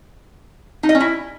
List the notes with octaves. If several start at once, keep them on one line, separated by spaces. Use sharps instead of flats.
D#4
D#5
C#4
E4